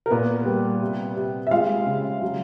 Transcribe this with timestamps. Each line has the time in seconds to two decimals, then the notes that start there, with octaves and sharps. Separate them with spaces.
0.06 A#4
0.11 A#2 B3 B4
0.46 G3
0.81 C3
1.16 C3
1.47 E5
1.51 G#3 F4 F5
1.86 C#3
2.22 F#3